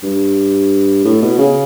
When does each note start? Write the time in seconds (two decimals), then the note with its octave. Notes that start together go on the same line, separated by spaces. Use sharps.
0.03 G2
1.05 A2
1.22 B2
1.38 C#3